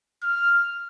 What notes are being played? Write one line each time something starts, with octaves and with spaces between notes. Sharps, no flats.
F6